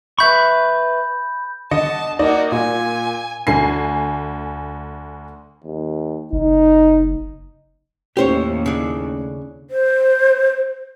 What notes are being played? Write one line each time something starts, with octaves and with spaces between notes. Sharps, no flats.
B4 E5 B5 C#6 G6
D3 D#5 A5 C#7
A#3 D#4 F#4 D5 D#5
A#2 G#5
D2 G#5 C7
D#2
F#1 D#4
D#2 A2 C#4 G4 C5 C#5
C#3 D4
C5